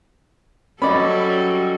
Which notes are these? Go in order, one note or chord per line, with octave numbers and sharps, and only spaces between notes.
F#3 G3 C#4 A4 D5 D#5 B5